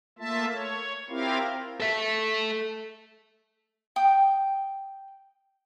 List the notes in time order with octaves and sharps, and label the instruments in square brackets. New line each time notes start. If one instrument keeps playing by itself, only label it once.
[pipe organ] A3 A#3 F4 E5 A5
C#5
C4 E4 F4 G4 A#4 F5
[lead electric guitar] A4 E5
[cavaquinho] G5 D#6